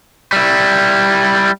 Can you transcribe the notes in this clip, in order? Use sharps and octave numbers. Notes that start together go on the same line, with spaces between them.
G3 E4